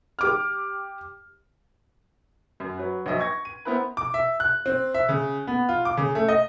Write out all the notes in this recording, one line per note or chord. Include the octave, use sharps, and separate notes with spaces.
G4 D6 F6
F#2
F#3 B4
A#1 F#3 D#5 E5
C#6 G#6 A#6
D#7
B3 C4 E4 A#4 B4
D6
E5
F#6
C4
E5
C#3
B3
F4
D6
C#3
A3
D#5